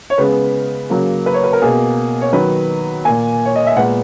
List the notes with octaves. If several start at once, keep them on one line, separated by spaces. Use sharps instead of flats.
C#5
C#3 G#3 B3 B4
C#3 F#3 A#3
B4
C#5
B4
A#4
B2 A#3 G#4
C#5
D#3 F#3 B3 B4
A#2 A#3 G#5
C#5
D#5
E5
A#2 G#3 B3 F#5